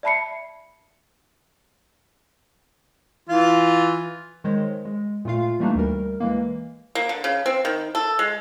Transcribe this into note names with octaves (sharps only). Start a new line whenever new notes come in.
D5 E5 A5 B5 C7 C#7
E3 F4
D#3 G#3 C5 C#5
G#3
A#2 A3 F4 F5
E3 G3 A3 A#3 D4 D#4
D2 G3 A#4
E3 G#3 A#3
A#3
D3
C#3
C4
D#3
A4
G#3